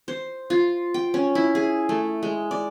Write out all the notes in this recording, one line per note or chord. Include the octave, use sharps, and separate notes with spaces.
C5
F4
G5
C#4
E4
G#4
A3
G#3
D5